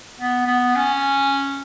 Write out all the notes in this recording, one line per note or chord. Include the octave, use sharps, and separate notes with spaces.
B3
B3
C#4